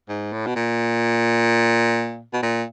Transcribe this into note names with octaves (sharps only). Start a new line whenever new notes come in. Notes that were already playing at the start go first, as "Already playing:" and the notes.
G#2
A2
B2
A#2
B2
A#2